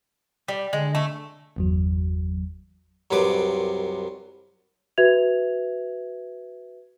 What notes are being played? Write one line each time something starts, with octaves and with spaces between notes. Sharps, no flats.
G3
D3 G#3
A3
G1 E2 F#3
C2 F#2 C3 B4 D6
F#4 B4 E5 G#6 F7